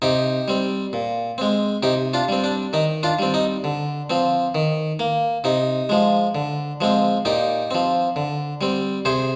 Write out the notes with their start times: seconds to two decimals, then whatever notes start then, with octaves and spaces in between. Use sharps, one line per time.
0.02 C3 D#4 G4
0.48 G3 C4
0.93 A#2
1.38 G#3 C4
1.83 C3 D#4 G4
2.13 D4 F4
2.28 G3 C4
2.44 D4
2.73 D#3 D#4
3.03 D4 F4
3.19 G3 C4
3.34 D#4
3.64 D3
4.10 F3 C4
4.55 D#3
4.99 A#3
5.44 C3 D#4
5.89 F3 G#3
6.35 D3
6.81 F3 G#3 C4
7.25 A#2 D#4 G4
7.71 F3 C4
8.16 D3
8.61 G3 C4
9.05 C3 G#4 C5